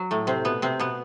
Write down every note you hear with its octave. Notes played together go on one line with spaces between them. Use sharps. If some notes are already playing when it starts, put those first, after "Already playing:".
Already playing: F#3
A2 A3
C3 C4
B2 B3
C3 C4
B2 B3